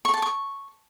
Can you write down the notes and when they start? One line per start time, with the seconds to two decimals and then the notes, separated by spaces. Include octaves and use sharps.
0.05 C#6
0.14 A5
0.22 C#6